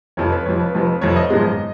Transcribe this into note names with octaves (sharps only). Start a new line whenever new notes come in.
F1 F2 F3 C#5
B4
F1 F2 F3 C#5
B4
F1 F2 F3
F1 F2 F3 C#5
D#5
G#1 F#2 F3 G#3 B3